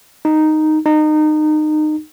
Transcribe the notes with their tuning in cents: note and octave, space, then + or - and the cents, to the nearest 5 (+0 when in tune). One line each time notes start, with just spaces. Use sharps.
D#4 -5
D#4 -25